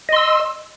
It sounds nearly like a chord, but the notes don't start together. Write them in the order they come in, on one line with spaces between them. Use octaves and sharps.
D#5 C6 E6